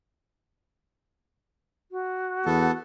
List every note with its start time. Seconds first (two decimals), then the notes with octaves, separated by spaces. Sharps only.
1.92 F#4
2.46 E2 B3 A4